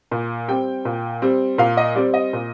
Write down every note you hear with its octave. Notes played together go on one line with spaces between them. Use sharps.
A#2
G3 C4 G5
A#2
G3 C4
A#2 F5
D#5
G3 C4 D5
D#5
A#2